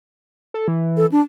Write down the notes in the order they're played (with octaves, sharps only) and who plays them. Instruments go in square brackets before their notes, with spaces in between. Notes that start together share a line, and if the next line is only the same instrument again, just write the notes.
[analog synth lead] A4
E3
[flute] A4
D4